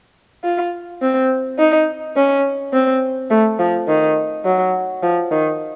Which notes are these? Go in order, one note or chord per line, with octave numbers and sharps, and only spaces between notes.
F4
C4
D#4
C#4
C4
A3
F3
D#3
F#3
F3
D#3